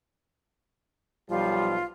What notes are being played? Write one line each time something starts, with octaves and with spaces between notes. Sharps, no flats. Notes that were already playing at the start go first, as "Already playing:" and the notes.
B1 F3 G3 F4